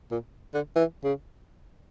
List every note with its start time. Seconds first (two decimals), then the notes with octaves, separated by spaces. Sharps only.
0.11 A#2
0.54 D3
0.76 E3
1.04 C#3